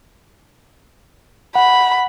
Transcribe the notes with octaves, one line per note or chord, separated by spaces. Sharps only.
F#5 B5